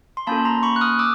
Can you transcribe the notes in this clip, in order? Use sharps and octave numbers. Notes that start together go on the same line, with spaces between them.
C6
A#3 C#4 F4 A4 A5 B5
A#5 C6
B5 C#6
F#6
D#6 F6
D6 E6